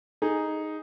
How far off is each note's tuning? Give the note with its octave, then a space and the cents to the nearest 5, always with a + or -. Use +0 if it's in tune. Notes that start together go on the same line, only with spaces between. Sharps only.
D#4 +0 G#4 +0